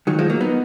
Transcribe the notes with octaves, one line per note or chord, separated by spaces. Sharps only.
D#3 F#3
F3 G#3
F#3 A#3
B3 D#4